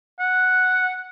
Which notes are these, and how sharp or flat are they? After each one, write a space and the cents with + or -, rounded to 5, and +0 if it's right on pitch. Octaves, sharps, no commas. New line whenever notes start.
F#5 +0